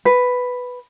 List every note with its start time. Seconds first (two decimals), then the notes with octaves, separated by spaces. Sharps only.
0.05 B4